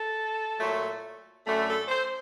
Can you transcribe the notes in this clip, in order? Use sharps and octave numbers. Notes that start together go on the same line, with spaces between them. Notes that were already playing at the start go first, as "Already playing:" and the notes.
Already playing: A4
A#2 F#3 A3
F#2 D3 A3
A4
C5